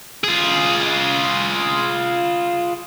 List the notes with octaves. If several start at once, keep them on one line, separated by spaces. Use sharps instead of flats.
F4 G#4